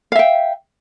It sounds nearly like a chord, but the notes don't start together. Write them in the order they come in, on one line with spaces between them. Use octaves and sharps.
F5 E5 G5